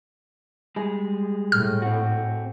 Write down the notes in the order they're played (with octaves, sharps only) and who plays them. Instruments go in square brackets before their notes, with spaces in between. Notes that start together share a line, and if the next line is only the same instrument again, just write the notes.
[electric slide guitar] G3 G#3 G#4
[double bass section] A2 [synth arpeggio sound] F6
[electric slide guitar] C4 F#4